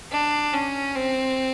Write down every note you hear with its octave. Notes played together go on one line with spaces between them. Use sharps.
D4
C#4
C4